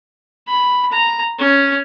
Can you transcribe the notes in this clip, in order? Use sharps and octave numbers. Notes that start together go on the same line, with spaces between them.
B5
A#5
C#4